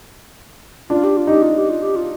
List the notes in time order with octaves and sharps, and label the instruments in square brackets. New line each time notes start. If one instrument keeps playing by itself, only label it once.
[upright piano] D4 [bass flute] F4
[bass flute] G4
F4
[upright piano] D#4 [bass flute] G4
[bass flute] F4
G4
F4
G4
F4